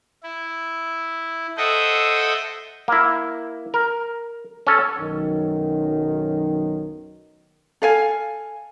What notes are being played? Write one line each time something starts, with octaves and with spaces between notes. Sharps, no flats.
E4
A4 C5 D#5 E5 F#5 G5
A#3 E4
A#4
C#4 A4
B1 F#2 D#3
A4 F5 G#5